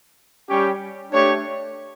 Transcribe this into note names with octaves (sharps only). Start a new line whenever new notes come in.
G3 C#4 G4 C#5 G5
A3 D4 G4 C#5